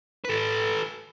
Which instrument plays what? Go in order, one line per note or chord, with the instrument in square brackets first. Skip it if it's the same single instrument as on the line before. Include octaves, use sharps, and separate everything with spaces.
[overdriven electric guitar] A4 B4